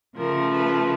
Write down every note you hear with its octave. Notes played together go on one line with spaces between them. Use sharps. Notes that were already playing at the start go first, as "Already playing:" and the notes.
C#3 F3 A3 A#4
B4